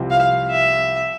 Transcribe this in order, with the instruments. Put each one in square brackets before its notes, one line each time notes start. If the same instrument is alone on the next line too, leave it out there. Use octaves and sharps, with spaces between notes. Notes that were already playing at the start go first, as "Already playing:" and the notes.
Already playing: [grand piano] C2 C3 F3 C4 E4
[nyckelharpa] F5
E5